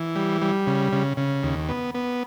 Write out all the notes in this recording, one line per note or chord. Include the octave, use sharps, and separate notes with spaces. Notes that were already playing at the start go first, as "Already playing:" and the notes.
Already playing: E3
G3
G3
C#3
C#3
C#3
D#2
B3
B3